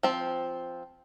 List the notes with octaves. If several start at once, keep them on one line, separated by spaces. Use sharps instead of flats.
F3 C4